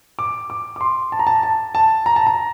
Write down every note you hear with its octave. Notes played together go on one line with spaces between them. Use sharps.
D6
D6
D6
C6
A5
A#5
A5
A5
A5
A#5
A5
A#5